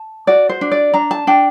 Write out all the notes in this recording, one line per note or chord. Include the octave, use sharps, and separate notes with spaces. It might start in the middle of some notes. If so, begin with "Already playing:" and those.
Already playing: A5
F#4 D5
C5
D4
D5
D4 A#5
A5
D4 G5